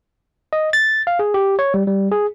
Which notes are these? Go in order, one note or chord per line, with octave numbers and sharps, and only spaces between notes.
D#5
A6
F5
G#4
G4
C#5
G3
G3
G#4